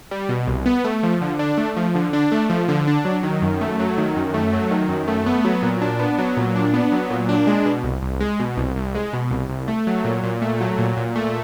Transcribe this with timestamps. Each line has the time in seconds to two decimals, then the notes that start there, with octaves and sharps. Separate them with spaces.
0.11 G3
0.29 B2
0.48 C2
0.66 B3
0.84 A3
1.03 F3
1.21 D3
1.39 D4
1.58 A3
1.76 F3
1.95 D3
2.13 D4
2.32 A3
2.50 F3
2.68 D3
2.87 D4
3.05 F#3
3.23 D#3
3.42 F#2
3.61 A3
3.80 F#3
3.98 D#3
4.16 F#2
4.34 A3
4.53 F#3
4.71 D#3
4.89 F#2
5.08 A3
5.26 B3
5.44 F#3
5.63 A#2
5.82 D4
5.99 B3
6.18 F#3
6.37 A#2
6.56 D4
6.74 B3
6.92 F#3
7.10 A#2
7.29 D4
7.47 G#3
7.66 B2
7.83 C2
8.02 C2
8.20 G#3
8.40 B2
8.57 C2
8.76 C2
8.95 G#3
9.13 B2
9.31 C2
9.49 C2
9.68 A3
9.87 F#3
10.05 A#2
10.23 A#2
10.42 A3
10.61 F#3
10.78 A#2
10.97 A#2
11.16 A3